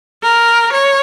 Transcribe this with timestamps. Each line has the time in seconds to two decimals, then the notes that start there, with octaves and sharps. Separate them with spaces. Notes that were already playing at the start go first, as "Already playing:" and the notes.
0.23 A#4
0.72 C#5